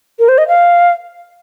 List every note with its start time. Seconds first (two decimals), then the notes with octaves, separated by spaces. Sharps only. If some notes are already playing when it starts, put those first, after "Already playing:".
0.19 A#4
0.29 C5
0.38 D#5
0.48 F5